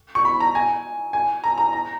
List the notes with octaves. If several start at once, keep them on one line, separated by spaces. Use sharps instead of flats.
C#6
B5
A#5
G#5
G#5
A#5
A#5
A#5